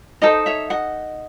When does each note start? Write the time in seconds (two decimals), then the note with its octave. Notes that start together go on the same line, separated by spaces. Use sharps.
0.22 D#4 A4 C5 D#5
0.46 C#5 E5
0.70 D#5 F#5